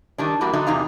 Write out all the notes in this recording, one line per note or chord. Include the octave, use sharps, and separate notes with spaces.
D#3 G3 D4
E2 G3 A#3 F#4
D3 F#3 A3 D#4 F#4
E2 C3 D#4 F5 A#5